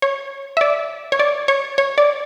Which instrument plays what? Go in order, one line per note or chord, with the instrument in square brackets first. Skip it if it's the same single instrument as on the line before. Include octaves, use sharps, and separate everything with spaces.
[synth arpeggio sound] C#5
E5
D5
C#5
D5
C#5
C#5
D5